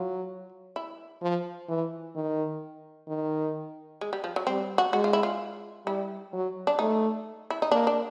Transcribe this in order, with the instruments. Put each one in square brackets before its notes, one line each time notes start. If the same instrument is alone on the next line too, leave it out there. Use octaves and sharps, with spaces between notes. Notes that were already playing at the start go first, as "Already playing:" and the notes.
Already playing: [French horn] F#3 [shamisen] F4
[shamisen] E4
[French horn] F3
E3
D#3
D#3
[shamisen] G#3
G3
F3
F#3
[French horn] G3 [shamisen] C4
[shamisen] F#4
[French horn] G#3 [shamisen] F#4
[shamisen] F4
E4
F4
[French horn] G3 [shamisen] E4
[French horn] F#3
[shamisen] D4
[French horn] A3 [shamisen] D#4
[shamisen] E4
D#4
[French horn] A#3 [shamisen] D4
[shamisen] D4